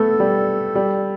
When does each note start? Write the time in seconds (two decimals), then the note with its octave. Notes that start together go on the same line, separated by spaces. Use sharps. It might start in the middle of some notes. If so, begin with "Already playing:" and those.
Already playing: A3 B3 A4
0.20 G3
0.75 G3